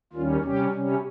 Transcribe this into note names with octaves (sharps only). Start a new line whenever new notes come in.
D#2 D#3 G3 C#4 F4
C3 G3 C#4 G4
C3 G3 C#4